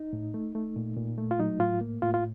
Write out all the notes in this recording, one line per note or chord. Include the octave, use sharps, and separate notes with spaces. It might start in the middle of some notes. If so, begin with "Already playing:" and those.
Already playing: D#4
A2
A3
A3
A#2
A#2
A3
F4
F#3 D#4
A2 F4
A#3
A2 F4
F4